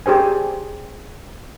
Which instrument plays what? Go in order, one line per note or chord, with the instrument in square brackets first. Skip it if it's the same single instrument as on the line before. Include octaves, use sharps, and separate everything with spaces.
[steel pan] G4 G#4 C5 G#5